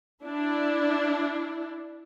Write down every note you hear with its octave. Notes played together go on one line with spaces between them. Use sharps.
D4 E4